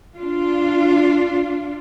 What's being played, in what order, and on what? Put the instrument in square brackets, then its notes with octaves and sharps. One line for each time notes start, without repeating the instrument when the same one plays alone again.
[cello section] D4 F4